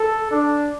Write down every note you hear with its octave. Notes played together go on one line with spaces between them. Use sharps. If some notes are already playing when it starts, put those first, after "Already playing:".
Already playing: A4
D4